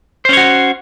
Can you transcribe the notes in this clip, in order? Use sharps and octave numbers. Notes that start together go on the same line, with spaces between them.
C#4 F#4 C5 C#5